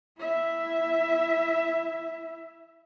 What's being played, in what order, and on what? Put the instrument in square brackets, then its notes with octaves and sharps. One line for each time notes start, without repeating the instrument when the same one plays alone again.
[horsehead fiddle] E4 E5